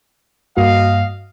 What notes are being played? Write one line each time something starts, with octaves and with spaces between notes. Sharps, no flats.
G2 A#3 F#4 D#5 F5